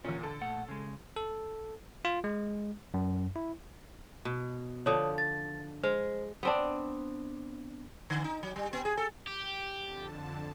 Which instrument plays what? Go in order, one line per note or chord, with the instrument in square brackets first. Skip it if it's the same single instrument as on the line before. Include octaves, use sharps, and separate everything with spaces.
[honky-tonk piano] E2 A#2 [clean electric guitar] C#4
[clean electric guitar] D3 [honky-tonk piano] A4
[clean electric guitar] A#2 A3 F#5
C#3 G#3
[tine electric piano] A4
F4
G#3
F#2
E4
[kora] B2
[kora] D3 F3 [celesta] C#5 D#6
[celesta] A6
[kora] G#3 [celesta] C5
[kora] B3 C4 D4
[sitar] D3
D#4
F#3
G3
B3
G#4
A4
[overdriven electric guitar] G4
[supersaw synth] F2 D3 A5